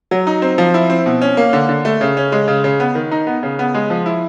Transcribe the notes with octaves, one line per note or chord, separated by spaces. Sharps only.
F#3
D#4
C4
F3
E4
C4
B2
C#4
A#3
D3
D3
A3
C#3
C#4
G#3
C#3
C#3
B3
D#3
D#4
B3
C#3
B3
G#3
F3
E4